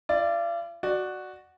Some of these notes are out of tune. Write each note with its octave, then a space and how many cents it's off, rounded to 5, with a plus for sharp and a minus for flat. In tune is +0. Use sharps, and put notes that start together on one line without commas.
F4 -40 D5 +0
F#4 +0 D5 +15